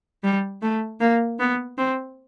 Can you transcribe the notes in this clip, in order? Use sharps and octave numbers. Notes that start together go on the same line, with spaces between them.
G3
A3
A#3
B3
C4